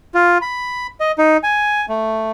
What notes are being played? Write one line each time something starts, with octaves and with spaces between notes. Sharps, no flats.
F4
B5
D#5
D#4
G#5
A3